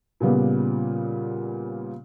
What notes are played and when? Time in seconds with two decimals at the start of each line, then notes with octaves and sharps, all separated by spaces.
0.20 A#2 C#3 G3 B3